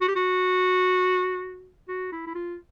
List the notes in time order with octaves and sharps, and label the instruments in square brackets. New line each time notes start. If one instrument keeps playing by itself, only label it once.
[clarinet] F#4
G4
F#4
F#4
E4
E4
F4